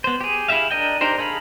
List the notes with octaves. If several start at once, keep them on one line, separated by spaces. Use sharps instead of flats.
B3 C5
G4 G#4
E4 G4 G#4 E5 F5
D4 A#4 D#5 G5
D4 D#4 G4 A#4 C5
D#4 G#4 A4 F5 B5